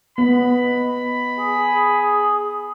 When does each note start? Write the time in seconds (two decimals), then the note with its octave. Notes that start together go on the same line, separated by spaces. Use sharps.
0.18 B3 D#5 B5
1.38 G#4 D#6